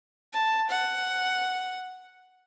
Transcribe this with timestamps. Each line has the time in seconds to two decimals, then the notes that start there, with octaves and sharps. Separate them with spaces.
0.33 A5
0.70 F#5